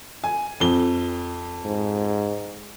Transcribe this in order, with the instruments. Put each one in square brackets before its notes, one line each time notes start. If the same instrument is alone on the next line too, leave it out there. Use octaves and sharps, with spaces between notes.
[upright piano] G#5
F2 G7
[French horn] G#2